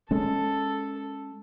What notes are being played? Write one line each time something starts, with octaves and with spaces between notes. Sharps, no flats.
G#3 C#4 A4